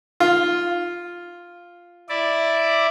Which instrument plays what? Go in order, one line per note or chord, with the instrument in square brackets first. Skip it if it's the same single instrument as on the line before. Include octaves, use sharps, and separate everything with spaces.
[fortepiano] F4
[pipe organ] E4 D5